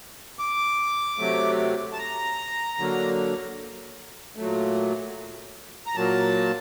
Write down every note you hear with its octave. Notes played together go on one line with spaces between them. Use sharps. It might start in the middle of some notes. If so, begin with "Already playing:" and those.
D6
C3 F#3 A3
A5
A#5
D3 F#3 A#3
A#2 F#3 A3
A#5
A#2 F#3 A#3 A5